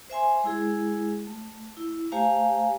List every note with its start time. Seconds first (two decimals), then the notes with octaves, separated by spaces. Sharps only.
0.10 C5 E5 G#5 C6
0.44 G#3 E4 G#4
1.27 A3
1.77 E4
2.12 A3 G4 C5 F5 G#5 A#5